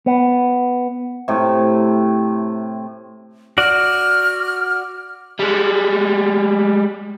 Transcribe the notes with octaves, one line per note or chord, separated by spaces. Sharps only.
B3
A2 C3
F#4 D5 F6
G3 G#3